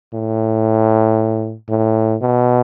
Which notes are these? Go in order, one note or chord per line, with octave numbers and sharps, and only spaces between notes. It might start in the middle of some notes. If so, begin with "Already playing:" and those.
A2
A2
B2